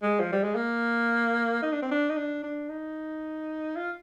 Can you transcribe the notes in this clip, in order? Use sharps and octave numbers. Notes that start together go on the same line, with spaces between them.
G#3
F3
G3
G#3
A#3
D#4
D4
C4
D4
D#4
D4
D4
D#4
F4